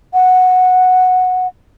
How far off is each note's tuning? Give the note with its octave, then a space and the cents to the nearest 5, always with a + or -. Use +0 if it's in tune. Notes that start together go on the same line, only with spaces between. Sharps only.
F#5 -10